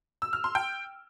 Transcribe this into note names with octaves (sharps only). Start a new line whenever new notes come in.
E6
F6
C6
G5